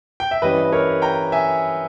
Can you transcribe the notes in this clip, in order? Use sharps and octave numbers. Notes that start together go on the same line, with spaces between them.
G5
E5
G2 E3 G3 C#4 E4 B4 D#5
A#4 C#5
G5 A#5
E5 G#5